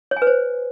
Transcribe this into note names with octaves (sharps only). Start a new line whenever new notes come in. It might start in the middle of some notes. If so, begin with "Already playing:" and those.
C#5
G#5
B4
C5